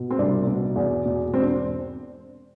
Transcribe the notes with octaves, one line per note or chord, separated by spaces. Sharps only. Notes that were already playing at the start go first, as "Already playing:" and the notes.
Already playing: B2
C4
C2 D4
B2
E2
B2
E1 C4
D4